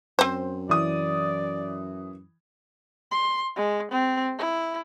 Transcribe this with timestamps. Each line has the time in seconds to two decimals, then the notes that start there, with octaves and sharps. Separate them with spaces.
0.19 F#2 C4 C5
0.69 E3 D5 D#6
3.12 C6
3.56 G#3
3.91 C4
4.39 E4